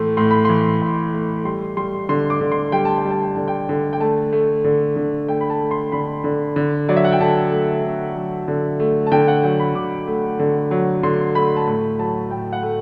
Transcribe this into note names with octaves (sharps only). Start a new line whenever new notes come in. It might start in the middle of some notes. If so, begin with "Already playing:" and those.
Already playing: A2 E3 A3 C6
A2 C6
B5
E3 C6
A2
A3
G3 C6
G3 C6
D3 C6
D6
D3
C6
G3 G5
A5
G5
G3
A5
G5
D3 A5
G5
D3
G5
A3 A5
A3
D3
D3
A3 G5
B5
A5
A3
C6
D3 B5
D3
D3
F#3 D5
E5
F#5
G5
D3 A5
A3
D3
F#3
D3
A3
A5
D3 G5
F#5
F#3 G5
B5
D3 D6
A3
D3
F#3
D3 C6
A3 B5
A5
A2 B5
F#3 A5
A2 G5
F#5
A3